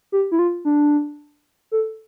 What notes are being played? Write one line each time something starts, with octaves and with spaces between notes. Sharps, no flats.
G4
E4
F4
D4
A4